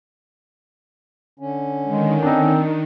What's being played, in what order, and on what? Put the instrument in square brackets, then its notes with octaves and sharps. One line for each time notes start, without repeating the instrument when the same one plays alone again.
[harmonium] D3 C#4
[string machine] D#3 [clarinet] G#3
[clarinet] C4 [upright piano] D4 D#4